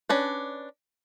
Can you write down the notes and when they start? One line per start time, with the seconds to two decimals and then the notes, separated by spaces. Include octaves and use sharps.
0.09 C#4 D4 B4